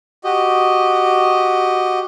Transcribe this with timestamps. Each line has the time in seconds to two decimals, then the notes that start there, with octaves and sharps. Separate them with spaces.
0.24 F#4 G4 D#5